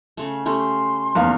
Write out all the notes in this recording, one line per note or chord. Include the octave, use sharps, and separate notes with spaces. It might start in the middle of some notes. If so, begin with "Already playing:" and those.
C#3 A3
A3 C#4 G4 C6
F1 E2 A#3 F5